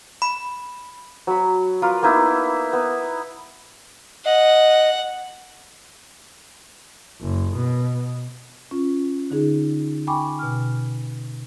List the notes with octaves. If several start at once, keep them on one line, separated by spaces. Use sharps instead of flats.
B5
F#3 B5
F4 A#4 B4 D6
A#3 B3 D#4 E4
B3
D#5 F#5
F#1
B2
C#4 F4
D3 D#4 G#4
G5 G#5 B5 C#6 D6
B2 F6